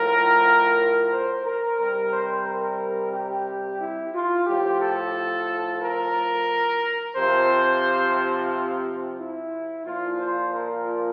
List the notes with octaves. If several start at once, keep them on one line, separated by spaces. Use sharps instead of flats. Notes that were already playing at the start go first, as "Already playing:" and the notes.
Already playing: A2 F3 A#4
C5
A#4
C3 G3 A#4
C5
A#4
G4
E4
F4
A2 F3 G4
A4
A#4
C3 F3 C5
E4
A#2 F3 F4
C5
A#4